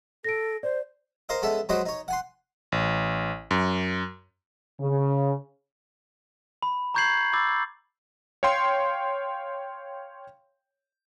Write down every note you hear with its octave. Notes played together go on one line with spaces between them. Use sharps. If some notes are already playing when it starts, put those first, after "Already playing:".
A4 A#6 D7
C5 D5
A#4 C5 D#5 F5
G#3 B3 C#4 A4 E5
F#3 G#3 F#4 B4 C5 D#5
D#4 C#5
F#5 G#5 C6
A1
F#2
C#3
B5
A#5 C#6 G6 G#6 C7 F#7
B5 D6 E6 A6
C#5 F5 G5 C6